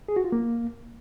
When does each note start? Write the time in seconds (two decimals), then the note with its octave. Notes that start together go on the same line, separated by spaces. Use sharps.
0.08 G#4
0.16 F#4
0.24 F4
0.32 A#3